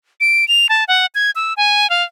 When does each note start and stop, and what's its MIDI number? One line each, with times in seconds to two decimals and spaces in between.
0.20 0.47 98
0.48 0.67 101
0.69 0.84 81
0.88 1.06 78
1.15 1.31 92
1.36 1.53 88
1.57 1.90 80
1.90 2.03 77